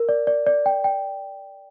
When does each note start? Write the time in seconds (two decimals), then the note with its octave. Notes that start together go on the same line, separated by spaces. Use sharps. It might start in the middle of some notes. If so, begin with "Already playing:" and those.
Already playing: A#4
0.09 D5
0.27 D5
0.47 D5
0.66 G5
0.84 G5